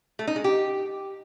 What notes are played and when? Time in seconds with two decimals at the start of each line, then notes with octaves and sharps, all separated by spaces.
0.19 A3
0.27 D#4
0.36 G#3
0.44 G4